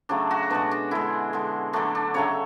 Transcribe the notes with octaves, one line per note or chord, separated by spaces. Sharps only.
C#3 F#3 A3 D4
F#4
B2 G#3 D4
D4
D3 G#3 E4
D3 G#3
D3 F#3 A3 D4
D4
C#3 F#3 A3 C#5